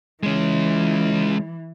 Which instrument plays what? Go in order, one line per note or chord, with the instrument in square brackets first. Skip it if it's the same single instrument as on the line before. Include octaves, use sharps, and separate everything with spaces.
[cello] E3 [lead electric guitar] G#3 C#4